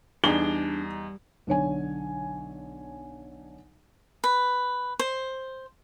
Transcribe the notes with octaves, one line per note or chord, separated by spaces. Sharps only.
E2 G3 D4 D#4 G#4 G7
B1 D3 C#5 G#5
B4
C5